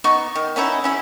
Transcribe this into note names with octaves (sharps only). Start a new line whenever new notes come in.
B3 D#4 C#6
D#3
B3 C#4 D#4 E4
C#4 E4 G#4